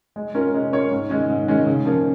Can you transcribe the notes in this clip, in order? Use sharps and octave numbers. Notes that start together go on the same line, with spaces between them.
G#3
C#4 F4 A#4 C#5
G#3
C#4 F4 A#4 C#5
G#2
D#3 G#3 C#4
G#2
D#3 G#3 C#4
C#3
F3 A#3 C#4